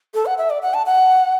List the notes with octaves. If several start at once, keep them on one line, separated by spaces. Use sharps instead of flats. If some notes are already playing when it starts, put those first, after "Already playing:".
A4
F#5
E5
D5
F#5
A5
F#5